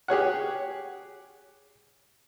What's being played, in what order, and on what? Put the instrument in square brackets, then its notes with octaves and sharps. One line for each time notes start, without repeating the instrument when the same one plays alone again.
[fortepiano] G4 G#4 C#5 F#5